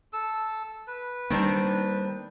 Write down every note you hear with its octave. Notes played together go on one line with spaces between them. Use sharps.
A4 E6
B4
D#3 G3 G#3 A#3 C4 D4